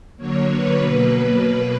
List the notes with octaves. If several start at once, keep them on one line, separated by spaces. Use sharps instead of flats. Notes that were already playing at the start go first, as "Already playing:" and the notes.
D3 F#3 A#3 C#5
B4
B2 F#3 A#3 B4
B2 A#3